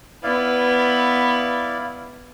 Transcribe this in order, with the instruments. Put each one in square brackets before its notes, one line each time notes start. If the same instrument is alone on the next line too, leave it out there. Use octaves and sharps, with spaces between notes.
[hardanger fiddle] B3 [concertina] E4 D5 F5